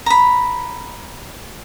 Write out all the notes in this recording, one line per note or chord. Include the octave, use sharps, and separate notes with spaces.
A#5 B5